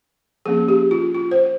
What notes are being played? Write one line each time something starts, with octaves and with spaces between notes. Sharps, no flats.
F3 A#3 C#4 G#4
G4
F4
F4
C5